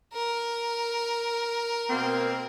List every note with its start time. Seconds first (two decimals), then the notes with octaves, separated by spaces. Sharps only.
0.13 A#4
1.90 B2 A#3 C4